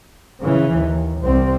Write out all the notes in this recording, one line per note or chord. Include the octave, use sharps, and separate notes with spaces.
C#3 E3
D#2
C2 C4